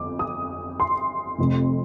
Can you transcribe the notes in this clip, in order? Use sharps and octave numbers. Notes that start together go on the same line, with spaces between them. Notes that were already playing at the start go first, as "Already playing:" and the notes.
Already playing: G1 F2 D6
D#6
C6
F1 F2 C3